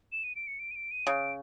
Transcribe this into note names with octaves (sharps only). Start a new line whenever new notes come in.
E7
D#7
D7
C#7
D7
D#7
D7
D#7
C#3 D7